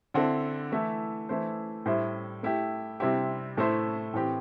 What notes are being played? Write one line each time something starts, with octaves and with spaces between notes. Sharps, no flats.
D3 C4 E4 A4
E3 A3 E4
E3 A3 E4 C5
A2 G3 E4 C5 E5
A3 E4 G4
C3 G3 C4 E4 G4
A2 A3 E4 C5 E5
A2 E3 C4 G4